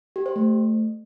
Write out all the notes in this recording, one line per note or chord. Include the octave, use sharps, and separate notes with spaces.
G4
C5
A3